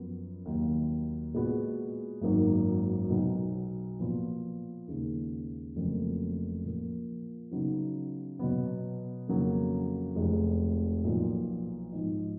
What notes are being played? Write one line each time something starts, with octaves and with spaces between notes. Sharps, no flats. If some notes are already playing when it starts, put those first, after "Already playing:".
Already playing: F#2 F3 B3
D#2 D#3 F#3
A#2 G#3 B3 F#4
G#1 F#2 D#3 F#3 A#3
B1 B2 F#3 B3
A#2 F3 B3 F4
D#2 C#3 G#3
F1 F2 C#3 F#3 A#3
A#2 F3 A#3
C#3 F#3 B3 D#4 F#4
B2 F#3 B3
F2 C#3 F#3 A#3
F1 F2 F3 G#3
B1 A#2 F3
G#2 F3 B3 D#4